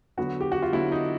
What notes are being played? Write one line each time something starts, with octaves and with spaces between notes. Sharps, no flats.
D3 F#3 B3 F#4
G4
F#4
F4
D3 F#3 B3 E4
D#4